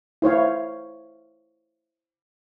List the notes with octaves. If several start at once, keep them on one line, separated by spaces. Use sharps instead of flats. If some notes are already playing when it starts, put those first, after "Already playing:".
E4 C5 C#5 F5